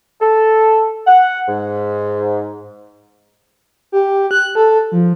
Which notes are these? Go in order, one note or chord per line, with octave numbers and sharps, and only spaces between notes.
A4
F#5
G#2
G4
F#6
A4
F3